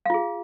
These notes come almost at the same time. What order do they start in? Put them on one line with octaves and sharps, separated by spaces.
F5 F4 G#4